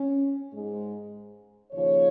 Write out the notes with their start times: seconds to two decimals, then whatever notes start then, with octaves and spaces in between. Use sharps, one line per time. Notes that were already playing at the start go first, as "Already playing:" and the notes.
Already playing: C#4
0.52 G#2 G#3
1.72 D#2 C#3 F3 C#5